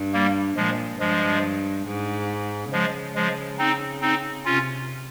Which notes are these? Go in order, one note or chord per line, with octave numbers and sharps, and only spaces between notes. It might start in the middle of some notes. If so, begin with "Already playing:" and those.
Already playing: G2
G3 A#3
A#2 F3 G#3
G2 F3 G#3
G#2
C#3 F3 G#3
F3 G#3
C4 D#4
C4 D#4
C3 C#4 F4